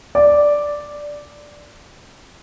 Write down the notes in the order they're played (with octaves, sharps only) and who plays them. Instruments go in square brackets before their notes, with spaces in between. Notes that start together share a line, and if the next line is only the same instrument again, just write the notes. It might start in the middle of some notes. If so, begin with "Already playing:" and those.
[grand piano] D5